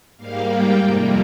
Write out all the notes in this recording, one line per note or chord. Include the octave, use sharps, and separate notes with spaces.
G#2 G3 A#3 F5
G5
F2 C3 G3 A#3